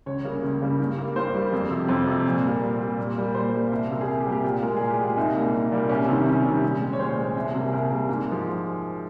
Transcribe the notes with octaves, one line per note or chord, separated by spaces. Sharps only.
C#2 C#5
C#3 G3 A#3
C#2
C#3 G3 A#3
G2
G3 A#3
G2 C5
G3 A#3
F2
C3 F3
F2 C5
C3 F3
A#2
G3 A#3
A#2
G3 A#3
A#2
G3 A#3
A#2 C5
G3 A#3
C2
C3 G3 A#3
G#4
C2 A#4
G4
C3 G3 A#3
G4
A#2 F4
G#3 A#4
A#2 G#4
G4
G#3
F4
C2 D#4
A#2 G3 A#3
C2
A#2 G3 A#3
C2 C#4
C3 D#3 G3
C2 C#4
C3 D#3 G3
A#2
G#3
C#5
A#2 C5
G#3
C2
C3 G3 A#3
G#4
C2 A#4
C3 G3 A#3
G#2
F3 G#3